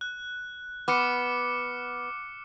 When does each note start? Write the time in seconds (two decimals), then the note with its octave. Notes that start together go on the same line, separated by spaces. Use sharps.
0.01 F#6
0.88 B3 D6 F6 C#7